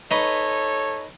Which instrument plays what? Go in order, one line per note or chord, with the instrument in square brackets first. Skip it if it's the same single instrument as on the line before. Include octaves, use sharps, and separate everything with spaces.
[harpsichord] D#4 B4 C#6 [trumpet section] A4 C#5